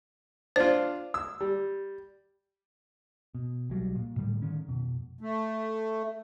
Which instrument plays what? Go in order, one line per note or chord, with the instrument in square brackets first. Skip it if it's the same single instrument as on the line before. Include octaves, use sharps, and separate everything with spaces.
[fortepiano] D4 F4 [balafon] C5
[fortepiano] E6
G3
[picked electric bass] B2
B1 F#3 G3
A#2
A2 D3 G3 A3
D3 D#3 C#4
F2 B2
[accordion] A3